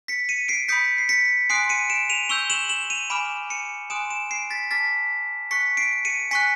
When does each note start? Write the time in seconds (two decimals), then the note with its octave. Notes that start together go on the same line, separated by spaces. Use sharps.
0.08 B6 C#7
0.29 C#7 D#7
0.48 C7 D7
0.68 B5 D#6 G6 B6 C#7
0.98 C7
1.09 B6 C#7
1.50 G#5 C6 D#6 F#6 C7 D7
1.69 C#7 D#7
1.90 D7 E7
2.09 D#7 F7
2.29 C#6 E6 G6 F7 G7
2.50 E7 F#7
2.69 E7 F#7
2.90 D#7 F7
3.10 G#5 B5 D6 F6 D7 E7
3.50 C#7 D#7
3.90 G#5 C6 D#6 F#6 D7 E7
4.10 D7 E7
4.31 C7 D7
4.50 A6 B6
4.71 A5 D6 F6 A6 B6
5.51 C#6 F#6 B6 C#7
5.77 C7 D7
6.05 C#7 D#7
6.31 G#5 C#6 F#6 B6 C#7